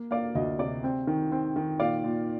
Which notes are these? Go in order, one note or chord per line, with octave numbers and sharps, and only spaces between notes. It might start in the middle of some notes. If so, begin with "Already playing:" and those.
Already playing: A#3
A#3 D5 F5
D2 D#5
C3 D5
C4
D#3
C4
D#3
A#2 D5 F5
A#2